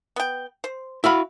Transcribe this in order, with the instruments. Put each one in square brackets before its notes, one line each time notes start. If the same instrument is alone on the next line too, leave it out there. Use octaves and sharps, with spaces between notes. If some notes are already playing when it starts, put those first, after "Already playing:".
[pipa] B3 G5
C5
[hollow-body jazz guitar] E4 F#4 F5 [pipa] E5 B5